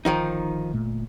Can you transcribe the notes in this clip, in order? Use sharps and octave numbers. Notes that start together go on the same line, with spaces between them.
G1 D#3 F3 D#4
A#2 A3